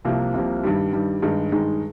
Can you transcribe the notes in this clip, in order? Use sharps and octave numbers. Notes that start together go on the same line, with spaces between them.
C2 C3 F3 A#3
C2 C3 F3 A#3
G2 D#3 G3
G2 D#3 G3
G2 D#3 G#3 D#4
G2 D#3 G#3 D#4